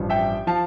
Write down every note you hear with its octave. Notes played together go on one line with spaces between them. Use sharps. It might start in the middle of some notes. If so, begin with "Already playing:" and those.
Already playing: A1 G2 F3
E5 G5
F3 F5 A5